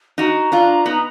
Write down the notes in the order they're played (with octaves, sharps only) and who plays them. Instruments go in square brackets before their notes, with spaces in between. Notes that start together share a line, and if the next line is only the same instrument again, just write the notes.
[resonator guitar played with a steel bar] D#4 F#4 [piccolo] A#5
[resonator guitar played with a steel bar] D4 F4
B3 D#4